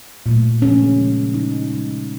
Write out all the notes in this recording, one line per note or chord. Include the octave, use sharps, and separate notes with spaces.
A#2 F#3 A3
C#3 F3 G#3 C#4
C#3 F3 G#3
C#3 F3 G#3 D#4
C#3 F3 G#3